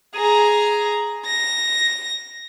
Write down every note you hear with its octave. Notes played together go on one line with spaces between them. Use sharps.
G#4 A#5
A#6